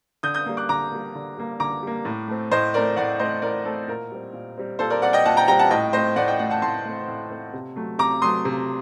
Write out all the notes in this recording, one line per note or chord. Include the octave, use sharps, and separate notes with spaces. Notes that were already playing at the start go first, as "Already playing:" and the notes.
D3 D#6 G6
D#6 G6
G3 A#3
D6 F#6
D3 A#5 D6
G3 A#3
D3
G3 A#3
D3 A#5 D6
G3 A#3
A2
A3 C4
A2 C5 D#5
A3 C4 A#4 D5
A2 D5 F#5
A3 C4 C5 D#5
A2 A#4 D5
A3 C4 A4
A#2 A#4
G3 C4
A#2
G3 C4
A#2 A4 C5
A#4 D5
G3 C4 D5 F#5
D#5 G5
A#2 F#5 A5
G5 A#5
G3 C4 G5 A#5
F#5 A5
A2 D#5 G5
A3 C4 C5 D#5
A2 D5 F#5
D#5 G5
A3 C4 D5 F#5
F#5 A5
A2 A5 C6
A3 C4
A2
A3 C4
C3
F#3 A3
C3 A#5 D6
F#3 A3 C6 D#6
C3